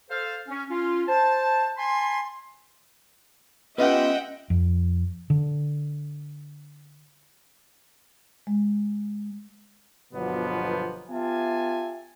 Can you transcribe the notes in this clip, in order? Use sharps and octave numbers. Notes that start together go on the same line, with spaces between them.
A4 C5 F5
C#4
C#4 F4
C5 A5
G#5 A5 B5 C6
B3 C#4 F4 G4 D#5 E5 F#5 G5
F2
D3
G#3
G1 B2 F3 F#3 A#3 B3
B3 F4 G4 E5 G#5 A5